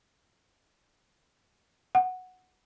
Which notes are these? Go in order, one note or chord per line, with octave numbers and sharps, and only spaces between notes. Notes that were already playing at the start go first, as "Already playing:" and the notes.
F#5